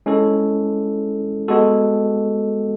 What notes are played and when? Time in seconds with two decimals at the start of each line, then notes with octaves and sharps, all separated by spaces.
0.06 G#3 C#4 E4 A4
1.48 G#3 B3 F#4 A4